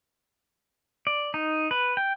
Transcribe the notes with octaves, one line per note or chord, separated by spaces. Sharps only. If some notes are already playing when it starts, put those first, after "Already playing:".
D5
D#4
B4
G5